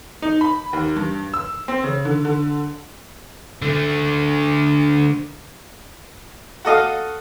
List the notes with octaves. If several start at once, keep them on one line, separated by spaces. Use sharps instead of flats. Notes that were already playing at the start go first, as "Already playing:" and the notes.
D#4
B5
D#2
G2
E6
C4
C#3
D3
D3
D3 A3
F#4 A4 D#5 F5